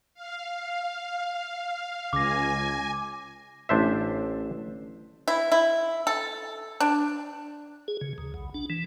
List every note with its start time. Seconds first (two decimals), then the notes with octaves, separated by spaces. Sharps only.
0.14 F5
2.13 C#2 G#5 D6 A#6
3.69 A1 D4 C5 E5
5.28 E4
5.52 E4
6.07 A4
6.80 D4
7.88 G#4
8.01 C#3
8.18 D#2
8.34 B1
8.54 D4
8.70 E3